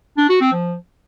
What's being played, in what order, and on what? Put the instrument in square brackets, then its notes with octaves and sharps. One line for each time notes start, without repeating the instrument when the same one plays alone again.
[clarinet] D4
F#4
C4
F3